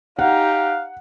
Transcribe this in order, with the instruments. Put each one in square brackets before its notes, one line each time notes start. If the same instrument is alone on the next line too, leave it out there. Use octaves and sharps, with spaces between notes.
[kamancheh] D#4 G4 [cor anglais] F5 [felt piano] F#5